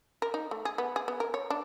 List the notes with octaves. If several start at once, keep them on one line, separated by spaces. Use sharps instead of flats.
A#4
D#4
A3
G#4
B3
G#4
B3
A#4
C#5
D4